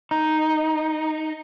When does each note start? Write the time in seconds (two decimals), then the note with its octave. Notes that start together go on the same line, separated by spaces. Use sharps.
0.11 D#4